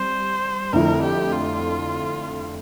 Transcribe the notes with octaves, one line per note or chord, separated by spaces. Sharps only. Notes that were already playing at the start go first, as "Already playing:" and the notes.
Already playing: G3 C4 C5
F2 D3 A3 E4 A#4
G4
F4